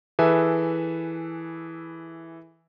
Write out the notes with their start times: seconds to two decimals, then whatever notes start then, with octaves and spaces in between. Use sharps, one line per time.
0.19 E3 G#4 A4 B4 E5 G#5